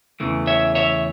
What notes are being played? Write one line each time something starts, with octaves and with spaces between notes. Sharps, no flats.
E2 C#3 E3 A3
C#5 E5
C#5 E5